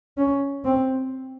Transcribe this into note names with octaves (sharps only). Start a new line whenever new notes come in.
C#4
C4